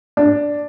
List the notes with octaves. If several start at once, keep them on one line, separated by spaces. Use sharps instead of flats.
D4